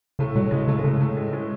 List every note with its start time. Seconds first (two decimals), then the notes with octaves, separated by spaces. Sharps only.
0.19 A2 C#3 A3
0.35 B2 F#3
0.51 C#3 G#3
0.68 A2 C#3 A3
0.79 G#3
0.83 A2 C#3 A3
1.00 A2 A3
1.17 G#3
1.33 G#3